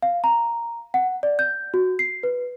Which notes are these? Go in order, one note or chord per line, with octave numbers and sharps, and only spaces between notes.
F5
A#5
F#5
D5
G6
F#4
C7
B4